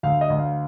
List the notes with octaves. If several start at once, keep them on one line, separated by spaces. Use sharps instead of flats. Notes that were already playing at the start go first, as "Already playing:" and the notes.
D2 F5
D#5
D2
F5